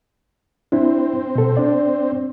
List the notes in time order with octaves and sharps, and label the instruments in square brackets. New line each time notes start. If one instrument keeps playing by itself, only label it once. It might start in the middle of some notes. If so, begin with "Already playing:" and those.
[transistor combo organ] C4 [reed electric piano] D4 E4
[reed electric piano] B2 A4
D4 D5